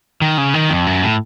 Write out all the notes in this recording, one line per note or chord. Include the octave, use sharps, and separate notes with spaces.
D#3
C#3
D#3
F2
F#2
A2